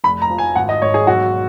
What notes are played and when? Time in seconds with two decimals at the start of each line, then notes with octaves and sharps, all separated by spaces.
0.04 F1 B5
0.22 A#5
0.30 F3
0.38 G#5
0.56 G#1 F#5
0.69 D#5
0.82 G#1 C#5
0.94 G#4
1.07 B1 F#4